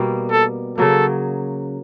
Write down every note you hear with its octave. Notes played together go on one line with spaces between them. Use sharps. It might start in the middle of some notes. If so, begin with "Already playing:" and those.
Already playing: B2 G3 A#3
A4
C#3 F#3 A#3 A4